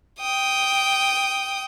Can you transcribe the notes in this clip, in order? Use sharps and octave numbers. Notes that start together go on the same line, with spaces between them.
G5 D#6